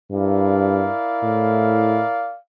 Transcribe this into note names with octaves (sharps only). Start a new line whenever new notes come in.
G2 E4 A#4 D5 F5
A2